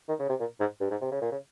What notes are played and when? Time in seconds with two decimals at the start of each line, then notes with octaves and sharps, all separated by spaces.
0.09 D#3
0.19 C#3
0.29 C3
0.40 A#2
0.60 G#2
0.81 G2
0.91 G#2
1.01 C3
1.11 C#3
1.22 A#2
1.32 C#3